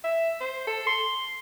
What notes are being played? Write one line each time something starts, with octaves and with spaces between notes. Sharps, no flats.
E5
C5
A4
C6